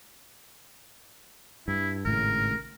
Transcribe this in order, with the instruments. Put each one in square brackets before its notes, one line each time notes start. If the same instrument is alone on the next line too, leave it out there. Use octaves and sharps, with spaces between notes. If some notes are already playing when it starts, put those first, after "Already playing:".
[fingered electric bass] G2 [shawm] E4
[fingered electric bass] G#1 A2 C#3 [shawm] A#4